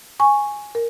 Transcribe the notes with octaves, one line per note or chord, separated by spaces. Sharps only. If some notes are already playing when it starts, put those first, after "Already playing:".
G#5 C#6
A#4